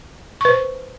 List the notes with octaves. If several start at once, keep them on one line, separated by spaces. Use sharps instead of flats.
B4 C5 C#6